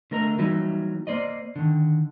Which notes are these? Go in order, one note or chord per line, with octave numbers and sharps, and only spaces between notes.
D3 A3 A#4 D#5 A#5
E3 F#3 G3 A#3 D#4 E4
A#3 C5 D5 D#5
D3 D#3